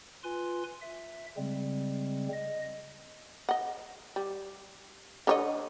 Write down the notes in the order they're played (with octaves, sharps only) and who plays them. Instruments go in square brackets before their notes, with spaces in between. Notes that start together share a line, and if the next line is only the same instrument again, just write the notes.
[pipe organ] F4 B4 G#5 C6
E5
C#3 G3 G#3 C4
D#5
[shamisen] D#5 F#5
G3
D3 C#5 D#5